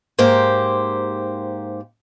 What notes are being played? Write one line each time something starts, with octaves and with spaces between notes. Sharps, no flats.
G#2 A#3 G4 C5